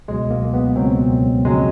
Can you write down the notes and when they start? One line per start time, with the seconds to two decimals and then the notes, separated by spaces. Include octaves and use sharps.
0.08 C#2 B2 F#3 G#3
0.31 A#3
0.54 B3
0.76 C#2 B2 F#3 C4
1.44 F2 C#3 F#3 G#3